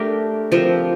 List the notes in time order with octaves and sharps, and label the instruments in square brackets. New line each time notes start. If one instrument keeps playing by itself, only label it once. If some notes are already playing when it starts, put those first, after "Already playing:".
Already playing: [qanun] A3 D4 G4 A#4
F3 C4 G4 A#4